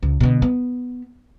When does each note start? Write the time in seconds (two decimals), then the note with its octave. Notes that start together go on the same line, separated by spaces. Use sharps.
0.03 C#2
0.20 B2 D3
0.42 B3